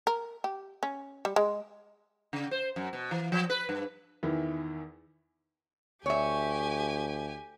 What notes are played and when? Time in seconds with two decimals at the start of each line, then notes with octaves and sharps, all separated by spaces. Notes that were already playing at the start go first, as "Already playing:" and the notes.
0.07 A#4
0.44 G4
0.83 C#4
1.25 G3
1.36 G#3
2.33 C#3
2.51 C5
2.76 F#2
2.93 B2
3.11 E3
3.32 F3
3.50 B4
3.69 G2
4.23 E2 D#3 E3 E4
6.06 D2 G4 C#5 E5 G#5